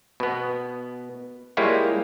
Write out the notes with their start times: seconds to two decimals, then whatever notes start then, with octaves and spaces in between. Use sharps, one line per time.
0.20 B2 B3
1.57 G3 G#3 A#3 E4 F4 C#5